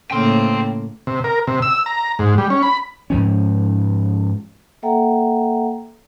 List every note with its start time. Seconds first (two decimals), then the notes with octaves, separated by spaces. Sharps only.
0.11 A2 C#3 A#3 G5 C6
1.07 C3
1.24 A#4
1.47 C3
1.62 E6
1.86 A#5
2.19 G#2
2.38 G3
2.50 C#4
2.63 B5
3.10 G#2 F3 C#4
4.83 A#3 A4 E5 F#5 G5 A#5